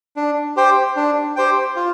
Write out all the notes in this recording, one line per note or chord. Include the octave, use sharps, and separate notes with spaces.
D4
G4 C5 G5
D4
G4 C5 G5
F4